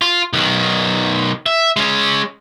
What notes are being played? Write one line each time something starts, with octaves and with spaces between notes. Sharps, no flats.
F4
B1 D#3
E5
G#3 C#4